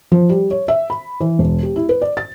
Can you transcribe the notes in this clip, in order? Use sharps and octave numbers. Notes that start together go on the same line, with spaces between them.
F3
G3
C#5
E5
B5
E3
E1
G4
E4
B4
D5
A6